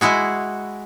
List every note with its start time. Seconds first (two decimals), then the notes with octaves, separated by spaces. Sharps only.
0.01 G#3 E4 F#4 G#4